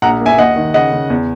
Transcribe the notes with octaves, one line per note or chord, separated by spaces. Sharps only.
A#1 F#5 A#5
A#3
E5 G#5
D#2 D#5 F#5
D#3
C#3 D#5 F#5
C#3
E2